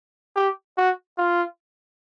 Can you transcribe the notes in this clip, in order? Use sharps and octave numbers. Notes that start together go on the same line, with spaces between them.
G4
F#4
F4